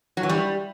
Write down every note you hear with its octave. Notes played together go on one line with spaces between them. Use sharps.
F#3
E3
G3